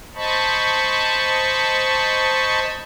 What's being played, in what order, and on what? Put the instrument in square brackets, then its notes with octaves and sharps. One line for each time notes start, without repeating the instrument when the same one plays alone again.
[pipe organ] C5 D#5 A5 B5 C#6